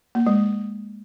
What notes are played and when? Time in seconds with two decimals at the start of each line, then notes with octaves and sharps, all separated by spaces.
0.15 A#3
0.26 G#3